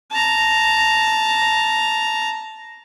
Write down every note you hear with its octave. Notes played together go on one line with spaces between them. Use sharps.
A5 A#5